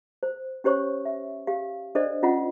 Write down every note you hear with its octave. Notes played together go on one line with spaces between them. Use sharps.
C5
C#4 G4 C5 C#5 C#6
E5
G4 F5
D4 A4 C5 D5 D#5
C#4 F4 D#5 F#5 B5